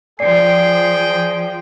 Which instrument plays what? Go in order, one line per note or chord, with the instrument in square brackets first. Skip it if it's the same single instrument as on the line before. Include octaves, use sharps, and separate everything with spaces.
[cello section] F3 [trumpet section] G#4 G5 [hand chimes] D5 C7